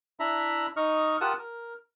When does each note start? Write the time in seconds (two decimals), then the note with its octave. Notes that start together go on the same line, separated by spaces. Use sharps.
0.20 D4 E4 E5 A#5 B5
0.77 D#4 D#5 C#6 F6
1.21 F4 G4 A#4 F#5 A5 D#6
1.38 A#4